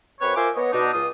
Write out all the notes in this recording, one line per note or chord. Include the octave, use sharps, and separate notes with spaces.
F#2 C4 B4 C#5
F4 A#4 C5 E5 G#5 D6
B3 C#5 D#5
B2 D4 D#4
C#2 F4 D#6